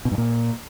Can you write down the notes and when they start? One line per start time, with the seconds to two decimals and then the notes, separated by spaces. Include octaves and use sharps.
0.05 B2
0.12 G2
0.18 A#2